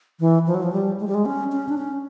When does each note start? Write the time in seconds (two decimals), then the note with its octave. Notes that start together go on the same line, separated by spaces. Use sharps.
0.20 E3
0.47 F3
0.54 F#3
0.63 F3
0.73 G3
1.00 G#3
1.07 G3
1.14 G#3
1.26 C#4
1.52 C#4
1.69 D4
1.78 C#4